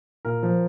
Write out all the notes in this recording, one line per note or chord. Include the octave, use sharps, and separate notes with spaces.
A#2 A#4
F3